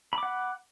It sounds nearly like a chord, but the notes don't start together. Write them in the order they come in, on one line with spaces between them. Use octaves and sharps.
B5 D6 F#5